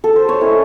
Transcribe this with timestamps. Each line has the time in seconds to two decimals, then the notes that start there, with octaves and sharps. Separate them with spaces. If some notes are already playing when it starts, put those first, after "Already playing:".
0.04 A4
0.16 C5
0.29 C#5
0.41 A3 C#4 E4 D#5